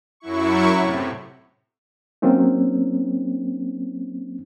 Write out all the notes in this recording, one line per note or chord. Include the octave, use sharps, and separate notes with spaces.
F#2 F#3 E4 C#6
A2 C3
F#3 A#3 C4 C#4 D#4